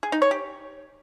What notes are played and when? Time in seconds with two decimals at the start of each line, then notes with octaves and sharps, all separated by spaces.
0.03 G#4
0.12 D#4
0.22 C#5
0.31 G4